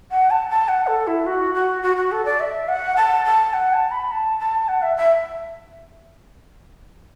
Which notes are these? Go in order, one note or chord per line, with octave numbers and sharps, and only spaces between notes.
F#5
A5
A5
F#5
A4
E4
F#4
F#4
F#4
F#4
A4
D5
E5
F#5
A5
A5
F#5
A5
B5
A5
A5
F#5
E5
E5